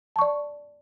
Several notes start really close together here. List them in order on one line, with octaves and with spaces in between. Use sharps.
A5 C#6 D5